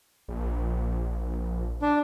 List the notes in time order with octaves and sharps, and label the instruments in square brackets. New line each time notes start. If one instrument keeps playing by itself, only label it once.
[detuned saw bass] A#1
[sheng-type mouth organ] D4